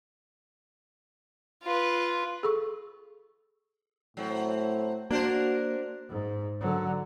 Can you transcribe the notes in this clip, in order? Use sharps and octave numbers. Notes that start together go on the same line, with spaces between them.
F4 B4
G#4 A4 C#6
A2 F#3 C4
A#3 D4 F#4 A#4 C5
G#2
D3 F#3